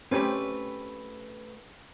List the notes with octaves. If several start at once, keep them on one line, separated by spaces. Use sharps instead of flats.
A3 C4 C#4 G4 B4